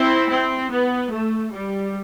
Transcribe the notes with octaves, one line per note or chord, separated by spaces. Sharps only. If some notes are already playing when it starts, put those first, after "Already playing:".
Already playing: C4 E4
C4
B3
A3
G3